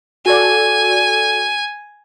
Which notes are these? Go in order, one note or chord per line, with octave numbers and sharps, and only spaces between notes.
F#4 A4 D5 G#5